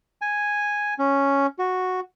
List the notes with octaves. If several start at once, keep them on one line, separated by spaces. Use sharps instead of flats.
G#5
C#4
F#4